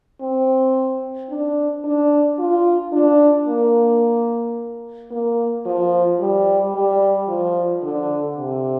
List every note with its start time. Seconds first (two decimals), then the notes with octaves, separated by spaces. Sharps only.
0.21 C4
1.30 D4
1.85 D4
2.39 F4
2.93 D4
3.47 A#3
5.11 A#3
5.66 F3
6.20 G3
6.75 G3
7.28 F3
7.83 D3
8.38 C3